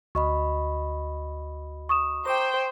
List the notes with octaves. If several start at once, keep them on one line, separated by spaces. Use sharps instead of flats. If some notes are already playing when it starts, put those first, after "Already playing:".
D2 F#4 D#5 B5 C#6
C#6 D#6 E7
C5 G5 A#5 D6